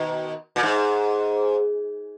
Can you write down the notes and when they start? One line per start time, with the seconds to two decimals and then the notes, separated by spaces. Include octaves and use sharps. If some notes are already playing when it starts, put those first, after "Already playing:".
Already playing: B2 D#3
0.56 A#2
0.63 G#2